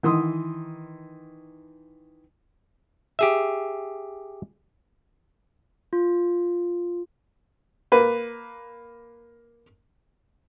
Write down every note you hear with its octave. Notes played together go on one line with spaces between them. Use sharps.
D#3 E3 C6 D#6
G4 G#4 E5
F4
A#3 B4